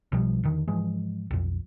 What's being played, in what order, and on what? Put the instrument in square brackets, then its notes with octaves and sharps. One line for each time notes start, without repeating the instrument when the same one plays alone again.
[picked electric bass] B1 B2 F3 G3
E2 D3 D#3
G#2 E3 F3 G#3
B1 F2